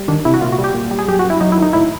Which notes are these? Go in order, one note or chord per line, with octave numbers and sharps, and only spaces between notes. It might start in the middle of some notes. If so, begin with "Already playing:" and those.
Already playing: G3
D#3 D4
C3 E4
F#4
A#2 F4
F#4
G3
G4
A#2
G3
G#4
F#2 G4
F#4
F#2
E4
F#3 D#4
E4
D#3 D#4
A2 E4